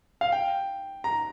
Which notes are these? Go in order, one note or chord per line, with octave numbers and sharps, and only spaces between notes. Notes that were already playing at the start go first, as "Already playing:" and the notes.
F5
G5
A#5